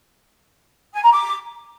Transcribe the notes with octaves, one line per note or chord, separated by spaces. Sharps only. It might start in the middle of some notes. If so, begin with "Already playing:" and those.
G#5
A#5
D6